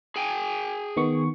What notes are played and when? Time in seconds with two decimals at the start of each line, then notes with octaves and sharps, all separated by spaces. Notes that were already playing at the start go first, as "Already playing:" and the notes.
0.16 G#4 G5 G#5
0.97 D#3 B3 C#6